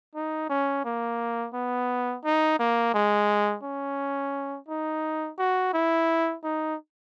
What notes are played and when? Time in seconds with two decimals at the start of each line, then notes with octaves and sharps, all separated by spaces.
0.15 D#4
0.49 C#4
0.85 A#3
1.54 B3
2.25 D#4
2.59 A#3
2.94 G#3
3.63 C#4
4.68 D#4
5.38 F#4
5.73 E4
6.44 D#4